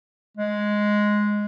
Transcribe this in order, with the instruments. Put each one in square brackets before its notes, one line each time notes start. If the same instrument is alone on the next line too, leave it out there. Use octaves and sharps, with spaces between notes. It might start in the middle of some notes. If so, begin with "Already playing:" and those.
[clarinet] G#3